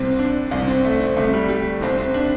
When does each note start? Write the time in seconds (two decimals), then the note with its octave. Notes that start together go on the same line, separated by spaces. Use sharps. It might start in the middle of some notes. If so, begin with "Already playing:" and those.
Already playing: C2 C3 C4
0.19 D4
0.51 C2 C3
0.68 C4
0.85 A3
1.00 C4
1.16 C2 C3 A3
1.33 G3
1.49 G3
1.81 C2 C3 C4
1.98 C4
2.14 D4